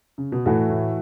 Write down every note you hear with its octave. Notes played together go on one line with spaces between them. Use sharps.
C#3
B2
A2 E3 A3 F#4 A4
A2